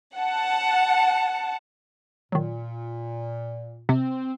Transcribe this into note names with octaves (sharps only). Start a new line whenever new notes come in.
F#5 A5
A#2 D#3 F#3
C3 C4